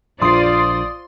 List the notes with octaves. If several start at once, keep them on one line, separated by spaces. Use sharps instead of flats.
A#1 F4 C5 D5 C6 D#6 C7